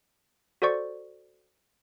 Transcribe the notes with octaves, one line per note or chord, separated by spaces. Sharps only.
F#4 A4 C5 D5 C#6